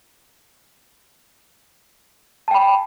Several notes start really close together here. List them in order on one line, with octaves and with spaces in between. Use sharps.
A5 G5 B5